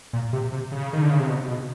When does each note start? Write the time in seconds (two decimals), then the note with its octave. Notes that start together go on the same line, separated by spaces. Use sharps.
0.13 A#2
0.33 C3
0.52 C3
0.72 C#3
0.93 D#3
1.02 D3
1.11 C#3
1.19 C3
1.28 B2
1.48 B2